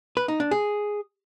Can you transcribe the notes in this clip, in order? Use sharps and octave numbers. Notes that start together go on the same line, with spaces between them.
B4
D#4
D4
G#4